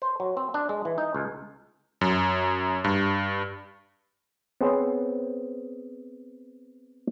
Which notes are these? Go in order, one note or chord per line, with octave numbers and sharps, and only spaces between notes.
C5
F#3
C4
D4
G#3
E3
D#4
C#2
F#2
G2
B3 C4 G#4 C5 C#5